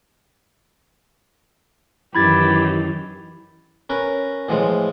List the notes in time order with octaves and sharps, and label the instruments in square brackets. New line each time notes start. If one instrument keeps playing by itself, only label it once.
[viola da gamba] F#2 D#3 E3 [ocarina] E4 [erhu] G4 [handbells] B5 G#6 A6
[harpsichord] C#4 A#4 B4
A2 E3 F3 G#3